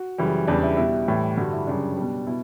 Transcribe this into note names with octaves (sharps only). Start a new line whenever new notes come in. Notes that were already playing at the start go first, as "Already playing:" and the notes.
Already playing: F#4
F#2 C#3 E3 G3
E2 C#3 G3 D4
E4
B2 G3 E4
A2 E3 G3
G2 D3 G3 F#4
E4
F#2 C#3 G3 D4
B2 G3
B2 E4